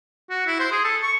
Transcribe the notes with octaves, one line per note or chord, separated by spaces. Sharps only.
F#4
E4
C5
G#4
A4
C#6